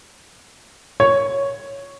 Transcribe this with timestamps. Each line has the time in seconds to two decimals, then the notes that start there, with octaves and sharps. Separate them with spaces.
1.00 C#5